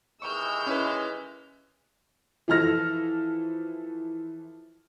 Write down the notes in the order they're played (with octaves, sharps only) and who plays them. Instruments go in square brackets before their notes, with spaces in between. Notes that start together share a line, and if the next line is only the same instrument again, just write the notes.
[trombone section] D#2 E3 G#3 [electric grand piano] C#6 [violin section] E6 F6 G6
[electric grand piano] C#4 E4 B4
[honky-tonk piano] E3 F3 A4 F6 A#6